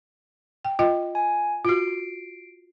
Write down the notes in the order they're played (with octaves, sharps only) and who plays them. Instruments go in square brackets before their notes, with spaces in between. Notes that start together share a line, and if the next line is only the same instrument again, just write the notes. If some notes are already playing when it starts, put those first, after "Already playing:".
[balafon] G5
F4 D#5 G5
[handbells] G#5
[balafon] F4 F#4 [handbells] C7 D7